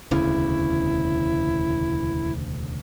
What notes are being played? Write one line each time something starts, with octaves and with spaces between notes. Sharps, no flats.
E1 D2 C#3 E4